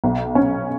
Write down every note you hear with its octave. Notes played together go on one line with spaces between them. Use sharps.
B1
C#4